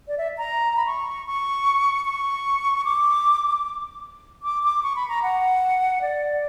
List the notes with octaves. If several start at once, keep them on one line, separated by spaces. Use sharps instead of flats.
D5
E5
A#5
B5
C#6
C#6
C#6
D6
D6
D6
C#6
B5
A#5
F#5
D5